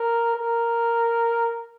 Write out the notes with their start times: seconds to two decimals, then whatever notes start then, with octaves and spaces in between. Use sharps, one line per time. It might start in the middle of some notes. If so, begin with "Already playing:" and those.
Already playing: A#4
0.35 A#4